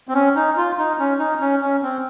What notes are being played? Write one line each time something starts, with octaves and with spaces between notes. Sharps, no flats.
C4
C#4
D#4
F4
D#4
C#4
D#4
C#4
C#4
C4